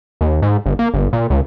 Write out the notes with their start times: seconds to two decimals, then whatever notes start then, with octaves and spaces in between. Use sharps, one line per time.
0.21 D#2
0.42 G#2
0.66 G1
0.79 A#3
0.94 G1
1.13 A#2
1.30 C#2